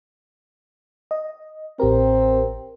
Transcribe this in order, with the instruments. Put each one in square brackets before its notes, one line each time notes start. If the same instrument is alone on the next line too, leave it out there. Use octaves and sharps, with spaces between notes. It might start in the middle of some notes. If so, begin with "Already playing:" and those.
[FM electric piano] D#5
[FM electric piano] A1 G4 A#4 [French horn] C4